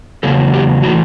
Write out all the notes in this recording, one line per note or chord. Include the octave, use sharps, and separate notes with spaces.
E2 C#3 F#3 A#3 A4
G4
A2 E3 A3 F#4